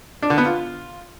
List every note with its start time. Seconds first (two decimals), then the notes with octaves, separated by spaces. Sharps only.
0.22 D4
0.30 D3
0.38 B3
0.46 F4